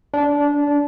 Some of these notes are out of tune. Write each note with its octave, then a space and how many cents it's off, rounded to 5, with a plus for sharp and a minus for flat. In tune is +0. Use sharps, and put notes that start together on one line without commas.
D4 -20